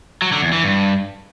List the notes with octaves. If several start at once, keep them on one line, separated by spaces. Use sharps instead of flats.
F#3
D3
E2
E3
G2